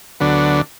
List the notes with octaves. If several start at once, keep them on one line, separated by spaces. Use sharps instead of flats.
D2 D3 F#3 B3 D4